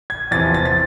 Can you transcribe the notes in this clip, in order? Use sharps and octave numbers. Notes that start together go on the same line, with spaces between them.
G#6
E2 C3 F3 A6
A6
A6